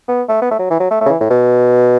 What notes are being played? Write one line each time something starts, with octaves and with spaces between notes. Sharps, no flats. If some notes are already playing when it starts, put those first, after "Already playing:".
B3
A3
B3
A3
F#3
E3
F#3
A3
A3
C#3
E3
A2
B2